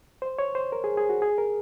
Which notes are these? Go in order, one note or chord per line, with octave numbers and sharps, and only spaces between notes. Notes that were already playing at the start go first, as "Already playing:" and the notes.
C5
C#5
C5
A#4
G#4
G#4
F#4
G#4
A#4